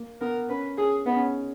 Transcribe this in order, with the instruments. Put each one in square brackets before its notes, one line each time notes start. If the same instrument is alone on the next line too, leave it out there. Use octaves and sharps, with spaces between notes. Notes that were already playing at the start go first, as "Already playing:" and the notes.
Already playing: [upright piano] A#3
[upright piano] B3 [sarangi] A#4
[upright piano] C#4 [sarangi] B4
[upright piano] C#4 [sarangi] G#4
[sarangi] B3 [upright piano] D#4
[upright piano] C#4